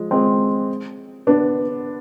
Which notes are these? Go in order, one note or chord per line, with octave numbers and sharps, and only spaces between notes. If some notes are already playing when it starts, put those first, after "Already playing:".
Already playing: F3 G#3
G#3 C4
B3 D4